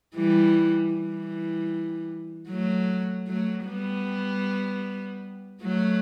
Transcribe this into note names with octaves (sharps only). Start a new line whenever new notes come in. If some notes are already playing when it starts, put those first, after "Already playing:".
E3 G3
E3 G3
F#3 A3
F#3 A3
G3 B3
F#3 A3